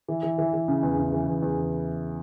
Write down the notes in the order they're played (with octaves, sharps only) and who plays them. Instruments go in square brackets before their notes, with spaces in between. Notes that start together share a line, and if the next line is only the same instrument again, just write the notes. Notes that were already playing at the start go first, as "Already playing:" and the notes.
[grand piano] E3
E3
E3
E3
C#3
E2
C#3
E3
E2
E2
E3